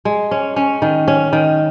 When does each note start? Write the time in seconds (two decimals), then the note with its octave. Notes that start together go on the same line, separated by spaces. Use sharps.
0.05 G#3
0.31 C#4
0.56 C#4
0.82 D#3
1.08 C#4
1.33 D#3